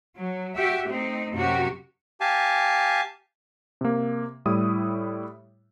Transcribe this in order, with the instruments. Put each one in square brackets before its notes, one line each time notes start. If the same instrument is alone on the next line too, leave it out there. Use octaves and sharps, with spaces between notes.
[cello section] F#3
F#4 G4 E5
A3 C4 D#4
F#2 C3 A#3 F#4 G4
[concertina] G4 F5 G#5 A5
[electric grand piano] C3 A#3
A2 G3 E4 D#6